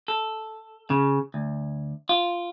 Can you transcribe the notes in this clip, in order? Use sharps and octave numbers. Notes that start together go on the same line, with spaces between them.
A4
C#3
D2
F4